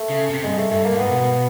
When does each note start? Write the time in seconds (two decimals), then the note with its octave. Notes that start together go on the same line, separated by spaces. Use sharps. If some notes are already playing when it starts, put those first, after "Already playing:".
Already playing: A3
0.10 C#3
0.31 C3
0.44 G2 G#3
0.58 A3
0.71 G2 A3
0.85 A#3
0.92 G#2
0.98 B3
1.12 B2